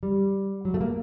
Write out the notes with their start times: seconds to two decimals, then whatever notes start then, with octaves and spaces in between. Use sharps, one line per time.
0.03 G3
0.65 F#3
0.74 A3
0.81 A#3